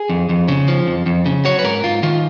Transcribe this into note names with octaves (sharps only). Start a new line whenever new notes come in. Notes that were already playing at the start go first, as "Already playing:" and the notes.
Already playing: G#4
F2
F2
C#3
F3
F2
F2
C#3
F#3 C#5
B4
G#2 A#4
G#2 F4
D#3 F4